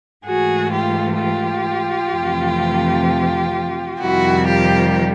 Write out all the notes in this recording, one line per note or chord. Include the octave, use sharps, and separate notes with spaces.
G#2 E3 A3 F#4 G#4
F4 G4
F4 G4
F2 C3 E3 A3
F2 C3 D#3 G3 E4 F#4
F4 G4